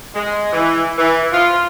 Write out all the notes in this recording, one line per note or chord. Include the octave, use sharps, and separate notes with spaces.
G#3
E3
E3
F4